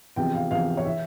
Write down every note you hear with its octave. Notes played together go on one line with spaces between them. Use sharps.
E2 C3 F3 G5
F5
E2 C3 F3 F5
C#5
E3 E5